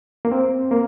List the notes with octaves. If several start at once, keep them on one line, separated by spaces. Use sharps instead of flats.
A#3
C4
A#3